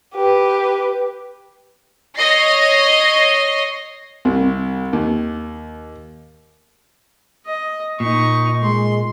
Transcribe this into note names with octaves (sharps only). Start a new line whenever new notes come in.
G4 B4
C#5 D#5 A#6 C7
C2
D#2
D#5
A#2 D#4 C#6
G#3 C6